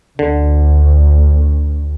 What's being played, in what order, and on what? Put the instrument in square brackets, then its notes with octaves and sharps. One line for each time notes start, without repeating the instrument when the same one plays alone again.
[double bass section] D2 [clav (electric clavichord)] D3